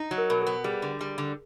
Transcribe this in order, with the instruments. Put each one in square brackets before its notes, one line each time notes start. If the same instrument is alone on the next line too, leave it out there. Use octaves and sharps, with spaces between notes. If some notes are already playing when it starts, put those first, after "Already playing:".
Already playing: [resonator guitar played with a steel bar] D#4
F#3
[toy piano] A#4
[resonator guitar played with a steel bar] B2 [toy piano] A#4
[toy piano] A4
[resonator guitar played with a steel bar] B3
[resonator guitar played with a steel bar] G3 [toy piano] G#4
[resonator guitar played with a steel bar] D3
G3
D3